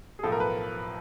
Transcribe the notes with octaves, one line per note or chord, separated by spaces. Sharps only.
G#4
B1 A2 F3 A4
A#4
B4